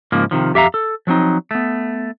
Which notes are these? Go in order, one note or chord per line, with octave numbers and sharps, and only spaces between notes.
G#2 C#3 F3 A#3
C3 D#3 F3
F2 G4 E5 F5 A#5
A4
F3 F#3 C4 D#4
A3 B3